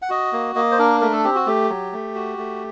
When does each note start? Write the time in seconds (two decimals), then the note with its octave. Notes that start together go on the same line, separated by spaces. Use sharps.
0.02 F#5
0.10 F#4 D#5
0.33 A#3
0.55 A#3 D#5
0.72 C5
0.79 D4 A#4
1.01 A3 A#4
1.13 A4
1.24 C4 G4
1.35 F#4
1.46 A3 G4
1.69 F#3
1.92 A3
2.15 F#4
2.38 A3